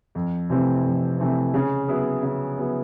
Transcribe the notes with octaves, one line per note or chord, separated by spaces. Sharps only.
F2
C3 E3 A3 C4
F2
C3 E3 A3 C4
C#3
F#3 B3 E4 G#4
C#3
F#3 B3 E4 G#4